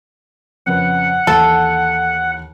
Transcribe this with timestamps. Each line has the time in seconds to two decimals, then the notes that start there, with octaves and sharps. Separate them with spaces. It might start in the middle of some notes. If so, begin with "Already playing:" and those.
0.66 F2 C#3 B4 F#5
1.27 D#2 E3 A4